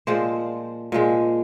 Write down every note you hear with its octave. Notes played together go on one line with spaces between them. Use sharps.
A#2 F3 G#3 C5 D5
A#2 F3 G#3